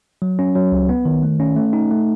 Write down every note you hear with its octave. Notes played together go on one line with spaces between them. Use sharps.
F#3
C#4
F#3
C#2
B3
D#3
A3
C#4
A3
D#4
A3